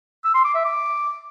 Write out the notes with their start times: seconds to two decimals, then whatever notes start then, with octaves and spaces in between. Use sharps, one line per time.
0.24 E6
0.34 C6
0.44 D6
0.55 E5
0.65 D6